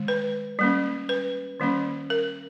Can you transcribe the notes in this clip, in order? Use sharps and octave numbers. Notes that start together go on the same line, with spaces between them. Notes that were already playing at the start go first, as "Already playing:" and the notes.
Already playing: D#3 G#3
B4
G3 A#3 C#4
B4
D#3 G3 A#3 C#4
A#4